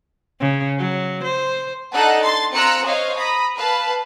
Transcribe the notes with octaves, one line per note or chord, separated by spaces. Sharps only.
C#3
F#3
C5
D4 D#4 A4 F#5 A5 F#6
C6 A6 C7
C4 F4 A#5 E6 F#6 C#7
C5 C#5 D#5 F5
A#5 B5 D#6
B4 F5 A5